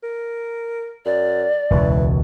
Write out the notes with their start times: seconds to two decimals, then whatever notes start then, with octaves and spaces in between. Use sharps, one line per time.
0.03 A#4
1.05 F#2 D5
1.70 E1 C#2 B2 E3